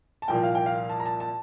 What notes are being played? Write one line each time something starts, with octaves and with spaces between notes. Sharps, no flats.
A5
C2 A#2 F3 A#3 G5
F5
G5
F5
A5
A#5
A5
A5